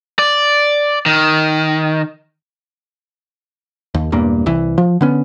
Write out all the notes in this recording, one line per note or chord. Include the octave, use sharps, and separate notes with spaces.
D5
D#3
D#2
E1 E2 G2 A#3
C2 E3
F3
D3 B3 C#4